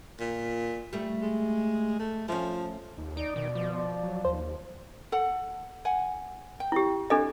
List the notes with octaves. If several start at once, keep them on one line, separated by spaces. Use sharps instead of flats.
A#2
G3 A3
G#3
A3
F3 A3 C#4
D#2
D#4 D5 D7
B2 D#3
F3
F#3
D#2 C5
A4 F#5
F#5 G#5
G5
E4 G4
D4 F#4 A4 D#5